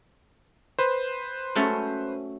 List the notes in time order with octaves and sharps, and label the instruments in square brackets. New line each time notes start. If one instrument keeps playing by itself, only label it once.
[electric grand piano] B4 C5
[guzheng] F#3 A3 C#4